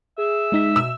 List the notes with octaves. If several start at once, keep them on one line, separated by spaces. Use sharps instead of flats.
G#4 E5
G#3 D#4 B6
B2 E6